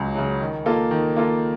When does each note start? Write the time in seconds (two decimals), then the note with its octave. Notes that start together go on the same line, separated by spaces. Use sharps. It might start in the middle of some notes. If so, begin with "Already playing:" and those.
Already playing: C#2 C#3 F#3
0.15 C#3 F#3
0.40 D#3
0.66 A#3 F4 A4
0.91 D#3
1.16 A#3 F4 A4